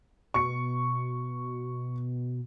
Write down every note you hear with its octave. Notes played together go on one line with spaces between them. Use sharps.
B2 C#6 C#7